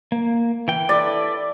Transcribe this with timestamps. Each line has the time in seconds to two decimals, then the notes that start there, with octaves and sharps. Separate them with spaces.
0.12 A#3
0.68 E3 G5
0.89 E4 A4 B4 D5